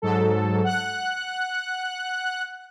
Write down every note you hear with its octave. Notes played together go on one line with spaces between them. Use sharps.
G#2 F#3 A4
F#5 F#6